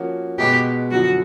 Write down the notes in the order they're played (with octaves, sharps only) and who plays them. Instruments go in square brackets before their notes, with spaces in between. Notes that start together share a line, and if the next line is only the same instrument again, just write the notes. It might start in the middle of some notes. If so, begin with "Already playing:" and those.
Already playing: [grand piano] F3 A#3 C#4 F#4
[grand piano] B2 G#3 B3 [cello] G4
[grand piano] F#2 D3 F3 [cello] F#4